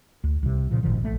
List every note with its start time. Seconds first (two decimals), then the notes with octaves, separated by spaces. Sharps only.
0.24 D2
0.43 C2 C3
0.71 A#2 C#3 F3
0.83 G#1 A#2 D#3 F3
1.02 A#1 A3